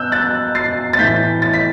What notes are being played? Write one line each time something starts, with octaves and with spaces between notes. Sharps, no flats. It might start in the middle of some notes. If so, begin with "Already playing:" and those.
Already playing: B2 E6 F#6 G6
F#6 A6
A6 C7
A6
A2 E3 G6 B6
A6
B6